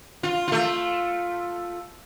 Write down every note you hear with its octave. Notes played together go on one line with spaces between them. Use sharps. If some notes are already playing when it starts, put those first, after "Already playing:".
F4
A3 F4